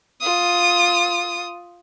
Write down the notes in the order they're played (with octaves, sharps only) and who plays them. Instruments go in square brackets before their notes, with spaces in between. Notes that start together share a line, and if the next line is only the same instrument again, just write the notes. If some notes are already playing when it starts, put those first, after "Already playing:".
[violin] F4 D#6